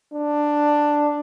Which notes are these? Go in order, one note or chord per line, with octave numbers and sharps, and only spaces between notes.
D4